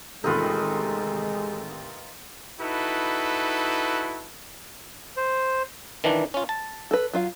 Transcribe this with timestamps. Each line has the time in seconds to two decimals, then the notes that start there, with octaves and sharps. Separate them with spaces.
0.24 A1 D#2 C3 G#3 D#4 F4 A4 B4
2.60 D#4 E4 F#4 A4 B4
5.17 C5
6.04 D#3 E3 D4
6.34 C#4 F4
6.49 A5
6.91 A4 B4
7.13 F#3 F4 F5